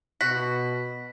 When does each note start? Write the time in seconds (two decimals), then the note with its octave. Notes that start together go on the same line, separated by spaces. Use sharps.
0.21 B2 F#4 B6